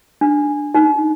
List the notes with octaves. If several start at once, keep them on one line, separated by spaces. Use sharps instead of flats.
D4
D#4